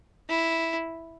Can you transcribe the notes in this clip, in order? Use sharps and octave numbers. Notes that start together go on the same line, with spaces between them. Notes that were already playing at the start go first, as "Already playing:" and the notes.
E4